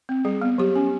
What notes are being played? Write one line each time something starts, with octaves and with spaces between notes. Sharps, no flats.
C4
G3 G#4
B3
F#3 G4
C#4